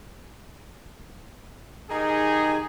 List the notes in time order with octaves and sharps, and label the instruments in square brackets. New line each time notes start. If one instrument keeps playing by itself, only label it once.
[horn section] D#3 D#4 G4 G#4